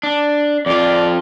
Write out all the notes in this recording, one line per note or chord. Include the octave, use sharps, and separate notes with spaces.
D4
F2 F4 D5